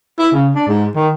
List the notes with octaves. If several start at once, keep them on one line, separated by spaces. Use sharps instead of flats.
E4
C#3
D4
G#2
D#3